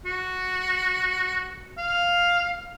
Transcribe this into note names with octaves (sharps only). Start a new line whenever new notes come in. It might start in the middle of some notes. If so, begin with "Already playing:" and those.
F#4
F5